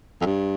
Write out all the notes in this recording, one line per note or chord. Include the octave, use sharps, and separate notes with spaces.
F2
G2